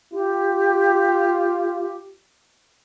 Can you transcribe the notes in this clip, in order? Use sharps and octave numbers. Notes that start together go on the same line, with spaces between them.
F4 G4